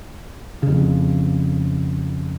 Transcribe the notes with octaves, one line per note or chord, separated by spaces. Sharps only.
F2 C#3